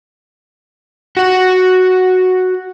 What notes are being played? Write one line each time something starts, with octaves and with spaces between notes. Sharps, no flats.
F#4 F#5